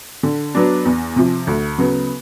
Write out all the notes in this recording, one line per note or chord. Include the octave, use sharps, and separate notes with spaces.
D3
F#3 B3 D4
E2
C3 F3
D2
C#3 F#3 B3